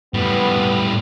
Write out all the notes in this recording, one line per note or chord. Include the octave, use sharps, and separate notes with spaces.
A2 G3 B3